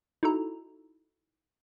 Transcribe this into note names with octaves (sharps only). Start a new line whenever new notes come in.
D#4 E4 F#4 A4 A#5